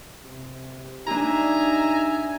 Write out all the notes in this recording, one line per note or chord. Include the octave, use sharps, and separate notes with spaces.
C3
D4 D#4 G4 E5 G#5 A#5